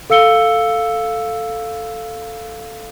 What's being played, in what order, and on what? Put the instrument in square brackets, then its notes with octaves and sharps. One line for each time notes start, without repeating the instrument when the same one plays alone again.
[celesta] A4 F5 E6 C#7 G7